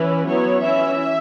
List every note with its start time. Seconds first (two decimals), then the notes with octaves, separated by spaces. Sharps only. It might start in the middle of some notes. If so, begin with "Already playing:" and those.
Already playing: E3 C#4 E4 B4
0.27 F#3 B3 E4 C#5
0.63 E3 C#4 E4 E5